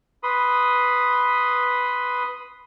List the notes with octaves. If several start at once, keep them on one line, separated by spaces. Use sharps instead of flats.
B4 B5 C6 D#6